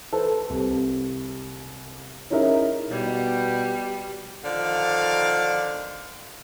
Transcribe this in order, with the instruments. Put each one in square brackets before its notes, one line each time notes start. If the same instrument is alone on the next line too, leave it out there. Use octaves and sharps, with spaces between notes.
[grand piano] A4 B4 C5
C2
C#4 D#4 E4 G#4 A#4 E5
[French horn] B2 [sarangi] G3
[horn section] D3 D#3 F3 D5 F5